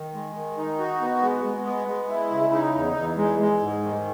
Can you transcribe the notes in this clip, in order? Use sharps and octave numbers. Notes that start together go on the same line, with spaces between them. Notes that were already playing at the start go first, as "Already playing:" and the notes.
Already playing: D#3
G#3
D#3
D#4
F#4
B3
G#3
G#3
B3
G#3
E4
C#3
D#4
E2
E2
G#3
G#3
G#2
D#3